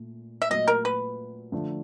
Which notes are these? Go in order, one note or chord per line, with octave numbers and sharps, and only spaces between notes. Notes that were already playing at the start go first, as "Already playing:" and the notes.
Already playing: A#2 A3
E5
A#2 F#3 A3 D#5
A#4
B4
D3 F3 A3 D4 F4